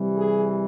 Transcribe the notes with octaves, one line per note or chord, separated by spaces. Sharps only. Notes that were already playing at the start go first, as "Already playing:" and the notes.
Already playing: C3 E3 G3
G#4